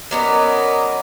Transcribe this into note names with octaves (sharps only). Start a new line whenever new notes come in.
F#3 B3 C#4 A#4 D5 D#5